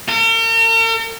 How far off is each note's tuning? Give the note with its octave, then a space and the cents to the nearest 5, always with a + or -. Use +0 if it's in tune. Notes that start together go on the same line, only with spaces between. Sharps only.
A#4 -45